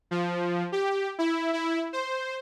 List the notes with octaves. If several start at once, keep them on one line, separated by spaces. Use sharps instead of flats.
F3
G4
E4
E4
C5